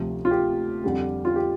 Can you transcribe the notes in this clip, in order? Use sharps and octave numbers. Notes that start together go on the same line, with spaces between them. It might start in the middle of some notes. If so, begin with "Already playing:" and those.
Already playing: D2 C3 F3
F4
G4
F2 D3 G3
F4
G4